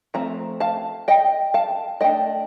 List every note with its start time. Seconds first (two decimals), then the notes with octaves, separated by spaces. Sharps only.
0.14 F3 A3 C4 A#5
0.60 F5 A5
1.08 D#5 G5
1.54 F5 A5
2.01 A3 D4 D#5 G5